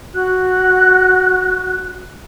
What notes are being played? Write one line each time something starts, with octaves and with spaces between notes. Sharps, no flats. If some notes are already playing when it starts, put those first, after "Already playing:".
F#4 F#6